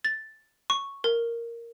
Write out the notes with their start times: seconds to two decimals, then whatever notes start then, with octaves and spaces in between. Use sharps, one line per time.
0.05 A6
0.70 C#6
1.04 A#4